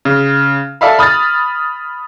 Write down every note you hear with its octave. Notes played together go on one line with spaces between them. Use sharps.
C#3
A4 D5 E5 F5 B5
B5 D#6 F6 A6